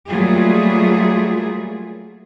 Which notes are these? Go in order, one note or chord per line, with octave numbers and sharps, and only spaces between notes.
F#3 G3 A3 A#3 F4 G#4